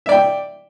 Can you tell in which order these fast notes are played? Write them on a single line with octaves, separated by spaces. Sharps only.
E5 D5 G5